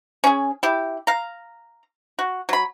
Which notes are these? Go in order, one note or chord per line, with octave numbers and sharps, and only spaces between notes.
C#4 G#4
E4 G4
F5 A#5
F#4
F#3 B5